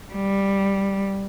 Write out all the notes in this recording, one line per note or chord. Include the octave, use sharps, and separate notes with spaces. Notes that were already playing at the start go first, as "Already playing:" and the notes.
G3